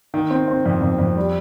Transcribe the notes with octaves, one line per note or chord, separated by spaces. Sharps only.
D#3
C4
C4
F2
F2
F2
G3